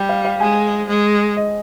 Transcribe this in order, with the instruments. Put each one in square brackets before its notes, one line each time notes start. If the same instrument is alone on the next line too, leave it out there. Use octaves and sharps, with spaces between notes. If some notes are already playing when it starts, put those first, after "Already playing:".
Already playing: [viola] G3 [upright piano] G5
[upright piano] F5
F5
[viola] G#3 [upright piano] G#5
[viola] G#3
[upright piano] D#5